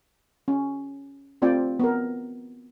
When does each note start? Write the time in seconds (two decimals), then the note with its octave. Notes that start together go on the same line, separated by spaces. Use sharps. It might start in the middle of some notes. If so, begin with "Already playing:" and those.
0.48 C#4
1.42 A3 C4 F4 D5 G5
1.79 B3 A#4